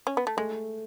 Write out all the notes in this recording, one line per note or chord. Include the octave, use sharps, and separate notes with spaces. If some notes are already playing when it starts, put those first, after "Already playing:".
C#4
B3
A3
G#3 A3